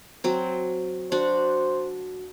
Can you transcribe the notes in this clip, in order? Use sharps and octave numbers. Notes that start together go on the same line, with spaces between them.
F#3 C4
D4 F#4 C5